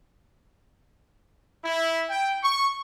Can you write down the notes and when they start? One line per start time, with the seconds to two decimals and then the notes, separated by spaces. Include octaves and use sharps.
1.64 E4
2.09 G5
2.43 C#6